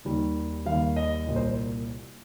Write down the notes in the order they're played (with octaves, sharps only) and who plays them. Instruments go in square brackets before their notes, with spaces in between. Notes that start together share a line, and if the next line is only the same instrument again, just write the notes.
[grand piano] D#2 D#3 G3
D#2 D#3 G3 F5
D#5
C2 A#2 G3
C5